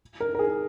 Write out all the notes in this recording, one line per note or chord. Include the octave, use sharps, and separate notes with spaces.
A#4
A#4
G#4